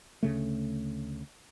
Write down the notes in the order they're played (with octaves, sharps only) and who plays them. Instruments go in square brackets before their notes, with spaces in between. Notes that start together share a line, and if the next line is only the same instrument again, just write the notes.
[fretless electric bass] D2 C#3 A3